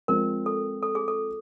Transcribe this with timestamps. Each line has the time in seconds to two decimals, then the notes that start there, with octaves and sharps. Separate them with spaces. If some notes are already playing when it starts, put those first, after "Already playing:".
0.08 F3 G#3 C4 A#4
0.46 A4
0.83 A4
0.95 G#4
1.08 A4